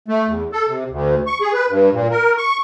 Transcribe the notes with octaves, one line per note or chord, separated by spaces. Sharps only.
A3
E2
A4
C3
D2
C#6
G#4
B4
G2
A#2
A#4
C#6